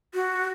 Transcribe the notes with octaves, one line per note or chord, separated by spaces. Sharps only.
F#4